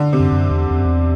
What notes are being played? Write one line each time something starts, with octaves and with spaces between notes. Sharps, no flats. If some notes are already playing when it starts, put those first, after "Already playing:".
Already playing: D3
C3
F#2
F#2
E2
E2
F#2
E2